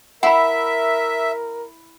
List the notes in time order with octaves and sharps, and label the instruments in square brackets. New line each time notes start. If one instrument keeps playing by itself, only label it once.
[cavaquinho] E4 [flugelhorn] A#4 [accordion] E5 [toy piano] F#5 B5